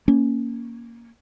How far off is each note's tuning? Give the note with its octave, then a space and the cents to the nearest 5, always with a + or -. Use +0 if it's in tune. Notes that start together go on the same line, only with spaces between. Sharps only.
A#3 +0 C#4 +0